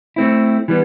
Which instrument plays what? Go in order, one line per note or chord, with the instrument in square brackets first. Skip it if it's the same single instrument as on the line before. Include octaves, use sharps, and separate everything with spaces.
[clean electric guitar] A3 C4 E4
E3 G3 B3